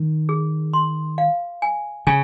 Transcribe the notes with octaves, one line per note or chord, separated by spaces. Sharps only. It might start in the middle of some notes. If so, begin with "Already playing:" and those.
Already playing: D#3
G#4
C6
F5
G#5
C#3 G#5